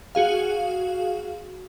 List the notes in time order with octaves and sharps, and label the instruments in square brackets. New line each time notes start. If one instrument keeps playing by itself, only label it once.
[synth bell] F#4 G#4 F5